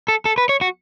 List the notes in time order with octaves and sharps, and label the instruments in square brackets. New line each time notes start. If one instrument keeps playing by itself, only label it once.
[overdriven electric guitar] A4
A4
B4
C#5
F#4